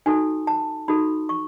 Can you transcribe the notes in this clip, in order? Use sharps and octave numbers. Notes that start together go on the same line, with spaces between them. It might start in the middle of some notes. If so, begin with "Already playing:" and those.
D#4 F#4 A4 G#5
A5
D#4 F#4 A4 B5
C#6